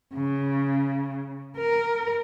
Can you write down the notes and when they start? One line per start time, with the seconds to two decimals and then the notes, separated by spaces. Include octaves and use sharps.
0.14 C#3
1.57 A#4